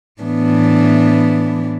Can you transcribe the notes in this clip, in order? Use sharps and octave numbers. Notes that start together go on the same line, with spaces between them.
A2 E3 B3 D4